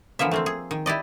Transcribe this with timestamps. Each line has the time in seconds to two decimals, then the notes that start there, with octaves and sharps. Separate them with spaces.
0.19 D3 E3 F3 A#3 E5
0.31 A3 A#3 C4
0.46 G#4
0.71 D#3
0.86 E4 G4 D5 D#5